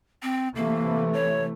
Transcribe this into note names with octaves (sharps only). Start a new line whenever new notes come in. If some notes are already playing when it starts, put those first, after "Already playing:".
C4
C3 E3 A3 A#3
C#5